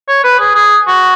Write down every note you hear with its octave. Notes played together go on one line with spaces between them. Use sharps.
C#5
B4
G#4
G#4
F#4